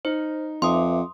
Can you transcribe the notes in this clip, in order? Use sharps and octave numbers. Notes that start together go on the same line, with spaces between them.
D#4 C5
F2 B4 E5 C6 D6 D#6